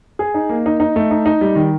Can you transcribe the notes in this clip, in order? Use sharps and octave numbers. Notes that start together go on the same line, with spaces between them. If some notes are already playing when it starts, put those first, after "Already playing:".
G#4
D#4
A#3
D#4
D#4
A3
D#4
D#4
G3
D#3